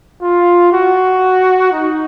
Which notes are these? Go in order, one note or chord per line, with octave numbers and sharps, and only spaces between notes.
F4
F#4
D#4